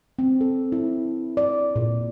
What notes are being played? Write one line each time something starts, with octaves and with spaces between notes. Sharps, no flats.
C4
A4
E4
D5
A#2